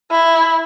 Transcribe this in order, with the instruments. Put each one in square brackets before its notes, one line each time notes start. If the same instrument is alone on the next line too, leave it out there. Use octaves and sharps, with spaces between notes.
[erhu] E4